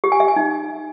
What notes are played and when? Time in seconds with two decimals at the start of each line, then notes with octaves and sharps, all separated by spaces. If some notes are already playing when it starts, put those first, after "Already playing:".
0.04 G4
0.12 G#5
0.20 E5
0.28 G#5
0.36 D#4